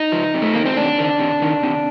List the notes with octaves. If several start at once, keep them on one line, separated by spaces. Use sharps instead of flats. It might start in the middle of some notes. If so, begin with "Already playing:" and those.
Already playing: D#4
F3
C3
A3
D#3 A#3
C4
C3 D4
D#3
C3
D#3
C3